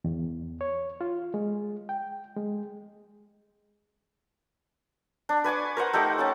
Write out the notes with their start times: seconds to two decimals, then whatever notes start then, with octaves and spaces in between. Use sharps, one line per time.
0.04 E2
0.61 C#5
1.01 F4
1.34 G#3
1.89 G5
2.37 G#3
5.29 D4
5.44 B4 G#5 C#6 D6
5.77 A#4 C5 F#5
5.93 A3 D#4 G4 F#5
6.18 C#4 F#5 A5